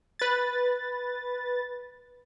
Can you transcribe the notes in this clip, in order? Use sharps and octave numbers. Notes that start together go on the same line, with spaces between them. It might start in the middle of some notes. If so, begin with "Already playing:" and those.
B4 A6